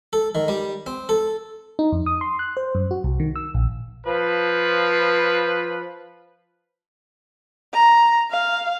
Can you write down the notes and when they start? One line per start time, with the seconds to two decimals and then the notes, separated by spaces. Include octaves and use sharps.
0.13 A4
0.35 D#3
0.48 G3
0.86 C4
1.09 A4
1.79 D#4
1.92 F2
2.06 D#6
2.21 C6
2.39 F#6
2.57 C5
2.75 F#2
2.91 F#4
3.04 C2
3.20 D#3
3.36 E6
3.54 A#1
4.05 F3 B4
7.73 A#5
8.31 F5